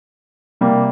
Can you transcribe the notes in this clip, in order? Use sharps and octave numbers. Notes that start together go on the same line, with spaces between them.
C3 G3 A#3